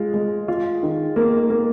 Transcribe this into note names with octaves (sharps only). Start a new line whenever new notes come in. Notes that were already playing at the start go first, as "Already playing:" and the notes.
Already playing: G#3 F4
G#3
F4
D#3
A#3
A#3